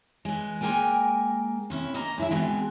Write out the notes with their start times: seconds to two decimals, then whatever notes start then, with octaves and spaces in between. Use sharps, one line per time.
0.25 E3 G#3
0.61 G#3 A#3 C4 A#4 G5 G#5
1.70 C3 C#4 E4
1.94 D2 A#3 D#5 A#5
2.18 F#2 E4 C5 E5
2.30 D2 B2 E3 G#3 C4